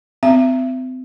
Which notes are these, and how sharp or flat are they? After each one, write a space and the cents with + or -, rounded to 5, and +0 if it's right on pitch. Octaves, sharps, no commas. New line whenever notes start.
C4 -35 E5 +30